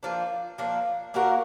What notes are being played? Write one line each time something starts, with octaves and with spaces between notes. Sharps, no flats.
F3 A#3 D4
F3 A#3 D4
A#3 D4 F#4 A#4